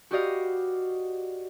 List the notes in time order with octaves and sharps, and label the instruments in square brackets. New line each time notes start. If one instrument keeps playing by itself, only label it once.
[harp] F#4 G4 B4 D5 D#5 F5